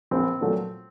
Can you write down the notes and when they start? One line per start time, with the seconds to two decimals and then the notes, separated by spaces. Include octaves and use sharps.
0.11 A#1 C4
0.41 A#2 F#3 A3